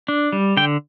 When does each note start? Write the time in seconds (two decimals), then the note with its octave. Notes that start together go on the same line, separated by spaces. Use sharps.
0.08 D4
0.33 G3
0.57 D3 G5